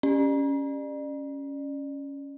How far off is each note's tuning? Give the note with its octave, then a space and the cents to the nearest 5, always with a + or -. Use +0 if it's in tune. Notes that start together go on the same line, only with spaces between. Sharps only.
C#4 +5 D5 +35